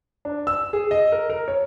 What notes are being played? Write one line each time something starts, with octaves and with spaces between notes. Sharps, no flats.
D4
E6
G#4
D#5
A#4
A#4
C#5